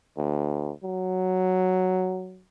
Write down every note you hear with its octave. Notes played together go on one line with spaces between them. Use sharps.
D2
F#3